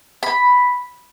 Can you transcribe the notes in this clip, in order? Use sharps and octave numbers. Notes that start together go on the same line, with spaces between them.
B5